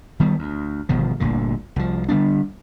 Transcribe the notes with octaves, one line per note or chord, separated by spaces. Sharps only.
D#3 G3 B3
D2
G1 B2 D#3 F3
G1 D2 A#2 D3
C2 F3
D3 G3 B3 D4